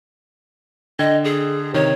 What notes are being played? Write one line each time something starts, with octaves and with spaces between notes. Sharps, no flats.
D3 D#5 G5 G#6
G#4
C3 D#3 C#5